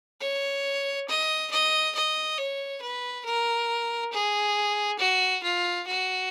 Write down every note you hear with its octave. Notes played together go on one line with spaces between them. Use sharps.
C#5
D#5
D#5
D#5
C#5
B4
A#4
G#4
F#4
F4
F#4